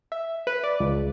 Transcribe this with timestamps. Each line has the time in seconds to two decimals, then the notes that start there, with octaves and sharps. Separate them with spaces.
0.12 E5
0.47 B4
0.64 D5
0.80 C#2